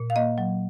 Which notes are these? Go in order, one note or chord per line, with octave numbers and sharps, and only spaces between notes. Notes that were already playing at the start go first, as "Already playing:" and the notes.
Already playing: A#2
F5
A#3 D#5
F#3